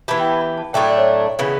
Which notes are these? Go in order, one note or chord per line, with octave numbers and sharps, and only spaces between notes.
E3 B3 E4 G4 A5
G5
A5
B5
A5
A2 F#3 A3 D4 G5
D5
C#5
C#3 E3 B3